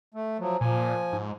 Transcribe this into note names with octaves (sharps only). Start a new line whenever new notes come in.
A3
F3 F#3
A#2 F3 G#5
G#2